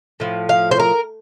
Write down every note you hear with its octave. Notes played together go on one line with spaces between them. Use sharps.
A2 F3
F5
C5
A#4